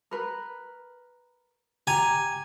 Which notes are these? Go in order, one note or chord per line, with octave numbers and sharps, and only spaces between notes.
A#4 B4
G4 G#5 A#5